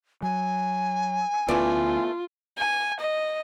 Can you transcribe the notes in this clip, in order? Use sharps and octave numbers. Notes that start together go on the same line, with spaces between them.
F#3 G#5
D2 E3 A3 B3 C#4 F4 D5
G#5
D#5